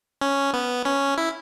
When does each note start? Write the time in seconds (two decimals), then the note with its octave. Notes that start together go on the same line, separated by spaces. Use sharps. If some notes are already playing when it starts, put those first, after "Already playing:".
0.21 C#4
0.53 B3
0.85 C#4
1.18 E4